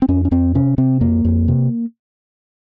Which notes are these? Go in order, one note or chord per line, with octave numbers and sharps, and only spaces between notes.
C4
F2 C#4
C#4
F2 C4
C3 C#4
C3 C4
F2 A#3
F2
C3